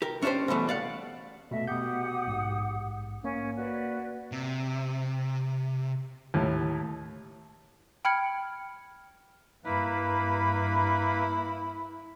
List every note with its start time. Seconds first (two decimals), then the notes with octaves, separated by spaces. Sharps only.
0.02 G4 A#4
0.22 C#4 D4 E4 G4 C5
0.48 B2 E3 G3 A3
0.69 D5 F5 F#5
1.51 B2 A3 D#5 E5
1.68 B2 G4 F#5 D#6 G6
2.27 A#1 G#2
3.24 A#3 C#4
3.57 F#4 B4 D5
4.32 C3
6.34 D#2 A2
8.05 G5 B5 F6 G#6 C#7
9.64 G2 A#3 E4 B4 B5